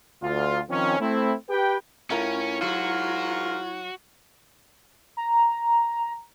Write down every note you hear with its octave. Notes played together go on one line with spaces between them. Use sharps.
D2 F4
D#3 F3 C4 C#4
A3 C4 E4
G4 B4 G5
A2 C#4 E4 F4 A#4
G#2 F#3 F4 F#4 A#4
A#5